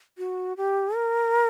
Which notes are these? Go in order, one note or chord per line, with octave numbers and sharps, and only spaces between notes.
F#4
G4
A#4